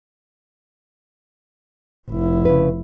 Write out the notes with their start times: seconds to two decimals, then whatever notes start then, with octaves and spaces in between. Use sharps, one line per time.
2.10 F1 E4
2.45 C#3 B4